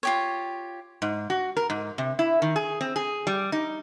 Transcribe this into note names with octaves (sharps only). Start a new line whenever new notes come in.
F4 G4 C#5
G#2
F#4
A#4
G#2
C3
E4
D#3
G#4
C4
G#4
G3
D#4